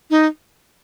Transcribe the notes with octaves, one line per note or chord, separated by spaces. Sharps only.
D#4